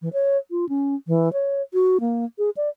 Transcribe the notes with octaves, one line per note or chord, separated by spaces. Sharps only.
E3
C#5
F4
C#4
E3
C#5
F#4
A#3
G#4
D5